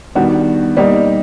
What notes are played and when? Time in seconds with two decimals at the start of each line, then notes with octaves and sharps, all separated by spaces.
0.15 D#3 G3 B3 D4 F#4
0.77 G3 A#3 D#4 G4